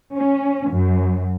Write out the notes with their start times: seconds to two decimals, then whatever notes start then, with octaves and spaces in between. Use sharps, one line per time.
0.14 C#4
0.70 F#2